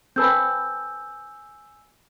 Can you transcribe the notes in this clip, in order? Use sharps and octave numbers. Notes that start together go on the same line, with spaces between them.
C4 A4 B4 G#5 E6 G6